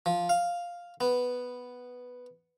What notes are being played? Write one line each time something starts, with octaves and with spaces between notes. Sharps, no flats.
F3
F5
B3